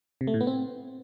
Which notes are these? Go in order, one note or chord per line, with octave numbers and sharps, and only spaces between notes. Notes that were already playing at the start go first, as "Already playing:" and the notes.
C3
A3
A2
B3
C4